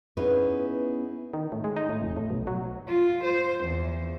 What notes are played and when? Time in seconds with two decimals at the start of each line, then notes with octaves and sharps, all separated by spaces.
0.17 B3 C#4 D#4 E4 G#4 B4
1.34 D#3
1.52 A2
1.64 G#3
1.76 D#4
1.89 A2
2.02 F1
2.17 A2
2.30 B1
2.47 F#3
2.89 F4
3.25 C5
3.64 E2